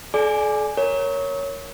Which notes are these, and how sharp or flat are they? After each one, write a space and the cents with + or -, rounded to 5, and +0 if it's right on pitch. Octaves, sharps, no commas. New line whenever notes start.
A4 -45 D5 +0 G#5 +0
A#4 +0 C#5 +0